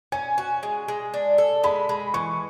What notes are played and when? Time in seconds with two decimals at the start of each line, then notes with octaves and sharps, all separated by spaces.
0.12 C#4 G#5
0.38 F#4
0.63 G#3
0.88 G#3
1.14 D4
1.38 A4
1.64 G#3 B5
1.89 G#3
2.14 E3 C#6